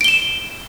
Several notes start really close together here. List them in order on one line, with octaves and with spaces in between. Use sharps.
D7 G7 E7